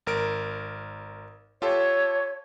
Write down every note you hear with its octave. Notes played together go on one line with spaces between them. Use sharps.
G#1 A#4 D7
F4 G4 A4 C#5